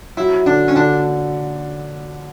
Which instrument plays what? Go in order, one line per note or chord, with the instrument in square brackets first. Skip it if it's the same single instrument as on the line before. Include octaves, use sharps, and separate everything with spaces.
[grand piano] F#3 [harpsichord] E4
[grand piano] D3 [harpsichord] D4
[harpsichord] C#4
[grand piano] D3 [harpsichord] D4